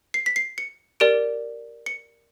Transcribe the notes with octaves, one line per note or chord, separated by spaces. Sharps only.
C7
B6
C7
C#7
G4 A#4 D5 D7
C#7